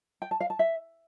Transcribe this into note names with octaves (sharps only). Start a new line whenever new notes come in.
G5
A5
F5
A5
E5